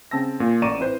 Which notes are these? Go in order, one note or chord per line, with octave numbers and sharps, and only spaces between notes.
C#3 C4 A5 E6 A#6
A#2
A1 D5 A#5 C#6 D#7 E7
C4 E4 B4 C5